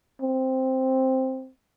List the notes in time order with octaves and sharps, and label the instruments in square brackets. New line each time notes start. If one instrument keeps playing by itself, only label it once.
[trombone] C4